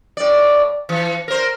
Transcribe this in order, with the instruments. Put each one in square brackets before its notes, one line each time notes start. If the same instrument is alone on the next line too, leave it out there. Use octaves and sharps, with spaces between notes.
[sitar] A2 D5
E3
A#4 C5